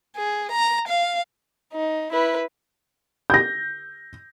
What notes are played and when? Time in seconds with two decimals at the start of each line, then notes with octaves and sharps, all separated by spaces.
0.17 G#4
0.52 A#5
0.88 F5
1.73 D#4
2.12 E4 B4
3.30 G6 A#6